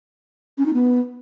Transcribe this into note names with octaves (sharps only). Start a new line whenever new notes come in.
C#4
D#4
B3